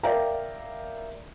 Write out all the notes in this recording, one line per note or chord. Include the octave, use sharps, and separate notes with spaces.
A#4 D5 E5 F5 G5 A#5